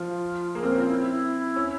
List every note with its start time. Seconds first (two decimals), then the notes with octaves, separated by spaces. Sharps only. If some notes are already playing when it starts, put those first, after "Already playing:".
Already playing: F3 F4
0.55 A#3 G#4
0.63 C4
0.65 A#4
0.72 C#4
0.77 C4 F4
0.88 E4
1.00 E4
1.11 E4
1.56 C#4